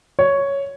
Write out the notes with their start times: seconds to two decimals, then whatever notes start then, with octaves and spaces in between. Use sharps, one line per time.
0.19 C#5